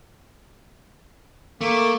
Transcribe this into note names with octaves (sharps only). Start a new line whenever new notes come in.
A3 A#3 D6